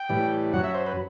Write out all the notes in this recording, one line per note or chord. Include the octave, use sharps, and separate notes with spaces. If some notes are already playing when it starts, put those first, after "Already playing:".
Already playing: G5
A2 E3 G3
F#2 F#3 F#5
E5
C5
B4